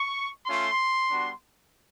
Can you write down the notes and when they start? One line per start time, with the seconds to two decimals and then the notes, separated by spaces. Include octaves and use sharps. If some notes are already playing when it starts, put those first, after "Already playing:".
Already playing: C#6
0.46 A3 C#4 F4 C6
1.08 G3 B3 D4 F#4